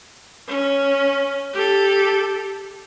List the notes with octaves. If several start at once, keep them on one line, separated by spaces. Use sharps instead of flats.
C#4
G4 A4